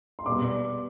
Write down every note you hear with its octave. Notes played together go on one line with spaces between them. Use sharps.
C6
B2 G3 B3 D5 D6